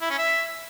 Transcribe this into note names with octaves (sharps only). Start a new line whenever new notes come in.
E4
C#4
E5